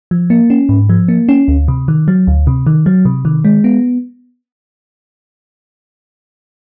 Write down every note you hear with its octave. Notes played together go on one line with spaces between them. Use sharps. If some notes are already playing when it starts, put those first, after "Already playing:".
F3
A#3
C#4
G#2
F3
A#3
C#4
D2
C3
D#3
F#3
D2
C3
D#3
F#3
C3
D#3
G#3
B3